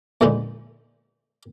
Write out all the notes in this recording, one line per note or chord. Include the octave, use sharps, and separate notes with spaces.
A#1 E2 D3 G#3 B3 D#4